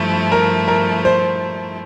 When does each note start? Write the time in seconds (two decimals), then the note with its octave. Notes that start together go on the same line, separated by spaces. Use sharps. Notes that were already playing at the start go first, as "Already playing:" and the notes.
Already playing: G2 F3 A3 E4
0.32 A#4
0.68 A#4
1.05 C5